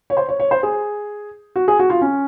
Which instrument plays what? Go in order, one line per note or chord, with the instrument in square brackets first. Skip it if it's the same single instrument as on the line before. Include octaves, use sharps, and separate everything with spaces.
[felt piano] C#5
C5
C#5
C#5
C5
G#4
F#4
G#4
F#4
F4
C#4